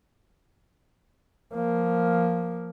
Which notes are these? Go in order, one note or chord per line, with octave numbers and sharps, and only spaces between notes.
F3 A#3